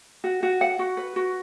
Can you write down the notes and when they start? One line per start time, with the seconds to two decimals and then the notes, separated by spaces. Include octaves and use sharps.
0.24 F#4
0.43 F#4
0.61 F#5
0.79 F#4
0.97 B4
1.16 F#4